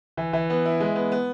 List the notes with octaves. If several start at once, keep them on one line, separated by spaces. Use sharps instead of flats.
E3
E3
B3
E4
G#3
B3
B3